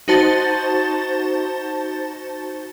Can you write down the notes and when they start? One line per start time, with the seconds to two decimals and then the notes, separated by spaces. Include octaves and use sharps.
0.08 D#4 F#4 C5 A5 A6